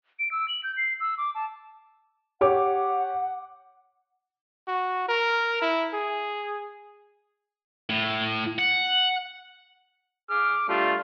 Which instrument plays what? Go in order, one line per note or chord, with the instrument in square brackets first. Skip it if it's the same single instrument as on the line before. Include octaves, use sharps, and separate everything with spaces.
[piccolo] D7
E6
F#7
G6
C7
E6
D6
A5
[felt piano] G4 C#5 D6 [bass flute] F#5
[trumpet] F#4
A#4
E4
G#4
[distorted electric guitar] A2
F#5
[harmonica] G#4 F6 [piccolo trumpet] D6
[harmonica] G3 A3 D4 [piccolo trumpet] F4